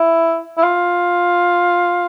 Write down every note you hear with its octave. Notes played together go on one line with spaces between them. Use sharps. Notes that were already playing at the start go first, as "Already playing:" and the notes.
Already playing: E4
E4
F4